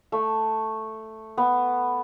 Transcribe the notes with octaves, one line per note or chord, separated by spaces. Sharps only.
A3
B3